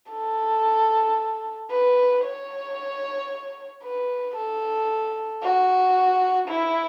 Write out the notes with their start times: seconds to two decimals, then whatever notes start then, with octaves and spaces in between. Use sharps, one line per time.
0.12 A4
1.71 B4
2.25 C#5
3.83 B4
4.36 A4
5.43 F#4
6.48 E4